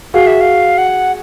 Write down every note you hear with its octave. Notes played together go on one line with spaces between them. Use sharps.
F#4 G#4 F5
E5
F5
F#5